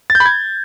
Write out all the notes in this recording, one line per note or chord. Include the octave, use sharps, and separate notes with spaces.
A6
G6
B5
G#6